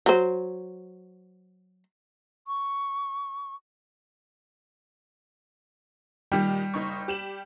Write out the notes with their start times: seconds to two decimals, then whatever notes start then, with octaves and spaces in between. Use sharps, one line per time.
0.06 F#3 C5
2.47 C#6
6.32 A#2 D#3 G3 G4
6.74 F#1 D#4 C#6
7.08 G4 E7 F#7